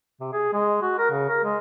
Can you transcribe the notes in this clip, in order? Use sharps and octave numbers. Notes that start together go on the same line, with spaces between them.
C3
G#4
G#3
F#4
A#4
C#3
A#4
G#3